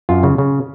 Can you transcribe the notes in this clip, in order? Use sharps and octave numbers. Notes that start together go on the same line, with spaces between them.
F#2 F4
C#3
C#3